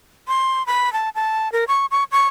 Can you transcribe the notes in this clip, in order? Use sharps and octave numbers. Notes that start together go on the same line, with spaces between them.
C6
B5
A5
A5
A#4
C#6
C#6
C#6